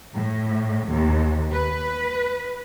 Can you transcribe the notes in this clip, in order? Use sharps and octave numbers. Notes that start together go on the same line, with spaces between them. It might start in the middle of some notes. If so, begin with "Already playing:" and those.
A2
D#2
B4